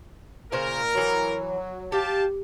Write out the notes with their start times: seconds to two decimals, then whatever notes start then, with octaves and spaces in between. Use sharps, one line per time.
0.52 A#2 C#3 A#4 C5
0.95 E3 F#3 A#5
1.92 G4 F5 G5 A5